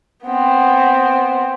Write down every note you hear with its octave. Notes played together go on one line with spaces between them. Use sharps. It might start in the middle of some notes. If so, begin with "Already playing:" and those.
B3 C4